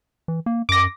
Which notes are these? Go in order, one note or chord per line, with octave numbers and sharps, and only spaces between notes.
E3
A#3
F#2 D6 A#6